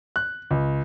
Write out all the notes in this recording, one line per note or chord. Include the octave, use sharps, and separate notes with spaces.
F#6
C#2